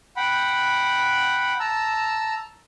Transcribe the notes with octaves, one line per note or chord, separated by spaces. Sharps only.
F#5 G5 B5
A5 A#5 E6